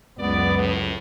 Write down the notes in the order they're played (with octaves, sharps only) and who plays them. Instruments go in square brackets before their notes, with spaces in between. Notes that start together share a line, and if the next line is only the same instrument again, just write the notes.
[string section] C#2 F#2 [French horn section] B3 [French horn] D5
[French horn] A2